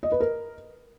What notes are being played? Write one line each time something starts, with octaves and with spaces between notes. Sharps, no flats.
D#5
B4
A#4